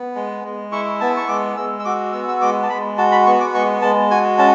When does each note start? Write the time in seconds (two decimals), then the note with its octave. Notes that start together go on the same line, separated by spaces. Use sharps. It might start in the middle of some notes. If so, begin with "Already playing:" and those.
Already playing: B3
0.15 G#3
0.45 G#3
0.72 E4 C#6
1.00 B3 A5
1.17 C#6
1.28 G#3 D6
1.57 G#3 E6
1.79 E6
1.85 F#4 D6
2.13 B3 E6
2.28 E6
2.41 G#3 D6
2.63 A5
2.69 G#3 B5
2.97 F#4 A5
3.12 B5
3.26 B3 C#6
3.40 D6
3.54 G#3 C#6
3.82 G#3 A5
4.11 F#4 G#5
4.38 C#4 A5